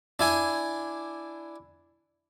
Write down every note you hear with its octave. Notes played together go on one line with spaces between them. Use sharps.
D4 E4 G#5